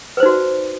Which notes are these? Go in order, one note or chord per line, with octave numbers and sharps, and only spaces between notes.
D#4 F#4 B4 C5 D5